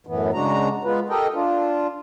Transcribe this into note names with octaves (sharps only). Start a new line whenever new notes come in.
F#2 A2 E3 B3
C#3 G#3 D4 F#4 A#5
G#3 B3 F4 B4
G4 A4 A#4 D#5 G5
D4 F4